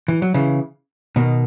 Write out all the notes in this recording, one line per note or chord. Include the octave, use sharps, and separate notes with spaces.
E3
F#3
C#3 E3
B2 D#3